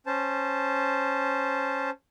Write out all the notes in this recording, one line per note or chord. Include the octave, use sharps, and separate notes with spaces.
C#4 C5 A5